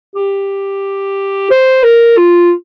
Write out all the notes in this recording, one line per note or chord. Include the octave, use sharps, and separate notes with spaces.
G4
C5
A#4
F4